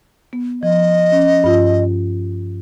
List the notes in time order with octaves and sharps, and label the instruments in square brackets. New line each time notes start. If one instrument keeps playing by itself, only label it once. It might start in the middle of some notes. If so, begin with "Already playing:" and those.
[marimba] B3
[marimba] F3 [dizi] D#5
[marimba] C#4
G2 F4